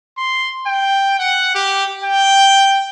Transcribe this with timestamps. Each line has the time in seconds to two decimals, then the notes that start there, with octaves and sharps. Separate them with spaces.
0.18 C6
0.67 G5
1.19 F#5
1.55 G4
2.04 G5